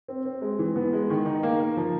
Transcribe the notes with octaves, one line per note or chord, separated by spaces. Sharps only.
C4
C4
G#3
E3
B3
G#3
D#3
D#4
A#3
A#3
F3